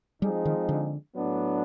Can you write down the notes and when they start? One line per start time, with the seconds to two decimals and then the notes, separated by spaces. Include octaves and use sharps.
0.22 F3 G3 G#3 C4 D#4 G#4
0.45 D#3
0.69 D3
1.14 A2 F#3 B3 D4